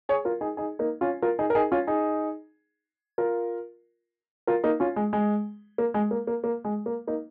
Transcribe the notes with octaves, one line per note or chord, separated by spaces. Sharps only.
G#4 C#5
F4 A#4
D#4 G#4
D#4 G#4
A#3 D#4
C#4 F4
F4 A#4
D#4 G#4
A#4
D#4 G#4
C#4 F4
D#4 G#4
F4 A#4
F4 A#4
A#3 D#4
C#4 F4
G#3
G#3
A#3
G#3
A#3
A#3
A#3
G#3
A#3
A#3 D#4